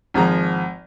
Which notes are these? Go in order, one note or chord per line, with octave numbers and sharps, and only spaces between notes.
G#1 F3 G#4 A#5